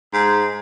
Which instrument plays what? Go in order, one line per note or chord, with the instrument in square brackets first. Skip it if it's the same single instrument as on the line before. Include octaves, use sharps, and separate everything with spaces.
[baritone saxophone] G#2